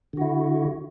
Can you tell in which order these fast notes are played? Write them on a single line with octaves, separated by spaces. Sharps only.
D3 F#4 E4